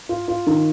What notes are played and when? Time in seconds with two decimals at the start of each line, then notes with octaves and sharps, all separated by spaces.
0.09 F4
0.28 F4
0.47 D#3